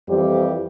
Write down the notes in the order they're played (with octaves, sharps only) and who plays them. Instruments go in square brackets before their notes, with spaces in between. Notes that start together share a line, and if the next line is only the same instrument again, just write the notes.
[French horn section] F2 E3 G3 C4 G4